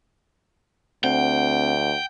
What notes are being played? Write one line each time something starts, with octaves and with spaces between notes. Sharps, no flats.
D2 C4 F#5 G5